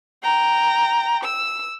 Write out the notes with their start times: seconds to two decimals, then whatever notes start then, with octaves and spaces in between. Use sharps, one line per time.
0.24 G5 A#5
1.24 E6